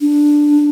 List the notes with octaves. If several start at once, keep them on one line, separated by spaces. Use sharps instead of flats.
D4